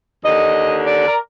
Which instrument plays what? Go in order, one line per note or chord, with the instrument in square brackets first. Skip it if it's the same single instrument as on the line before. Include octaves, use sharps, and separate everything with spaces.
[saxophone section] D#2 D3 D#5
D5
A#4